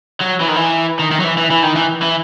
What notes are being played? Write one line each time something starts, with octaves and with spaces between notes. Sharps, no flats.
F#3
E3
D#3
E3
D#3
D#3
F#3
E3
E3
E3
D#3
E3
E3